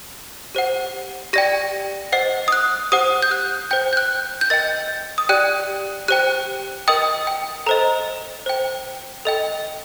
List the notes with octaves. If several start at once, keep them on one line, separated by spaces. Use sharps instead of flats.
G4 C5 F#5
G4 D5 G5 A#6
C5 D#5 F#5 C7
D#6
F#6
G4 C5 F#5 D#6
G6
F#6
C5 G5 G6
G6
F#6
G6
A#4 D#5 G5 A6
D#6
G4 D5 G5 F#6
G4 C5 G5 F#6
A#4 D#5 G5 D#6
G5
A4 C5 D#5 A#5
C5 G5
A4 D#5 G5